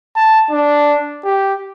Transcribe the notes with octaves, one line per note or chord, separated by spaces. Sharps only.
A5
D4
G4